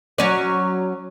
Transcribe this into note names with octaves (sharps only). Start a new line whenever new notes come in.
F#3 C#4 D5